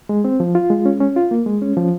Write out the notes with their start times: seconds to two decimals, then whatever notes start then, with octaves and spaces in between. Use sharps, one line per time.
0.09 G#3
0.25 C4
0.40 F3
0.55 F4
0.70 G#3
0.86 C#4
1.00 C#4
1.16 F4
1.31 A#3
1.46 G#3
1.62 C#4
1.77 F3